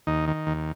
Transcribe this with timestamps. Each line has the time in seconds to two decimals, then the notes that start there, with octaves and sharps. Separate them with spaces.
0.07 D#2 D#4
0.28 D#3
0.47 D#2